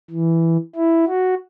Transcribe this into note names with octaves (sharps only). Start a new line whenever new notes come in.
E3
E4
F#4